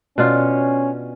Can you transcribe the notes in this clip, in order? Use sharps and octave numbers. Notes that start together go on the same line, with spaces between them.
B2 C#4 D4 F4